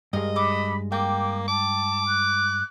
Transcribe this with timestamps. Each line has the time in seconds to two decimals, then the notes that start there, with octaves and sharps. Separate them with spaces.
0.13 G2 G#3 A#4 D#5
0.36 A4 B5 D6
0.92 A#3 G5 D6
1.48 A5 D6
2.06 F#6